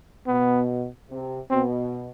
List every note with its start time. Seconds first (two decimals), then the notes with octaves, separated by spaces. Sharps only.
0.27 B2 B3
1.09 C3
1.50 B2 C4